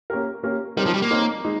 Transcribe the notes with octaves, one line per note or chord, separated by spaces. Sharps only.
A#3 C#4 G4 A#4
A#3 C#4 G4 A#4
G3 C4 D#4 A#4 C#5
F3
G3
A#3
C4 D#4 A#4 C#5
G#3 D#4